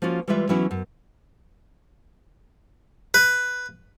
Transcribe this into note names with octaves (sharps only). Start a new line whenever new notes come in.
F3 A#3 C#4 F4 F#4
E3 G3 G#3 F4 B4 E5
E3 F#3 B3 C#4 E4 F#4
F#2
B4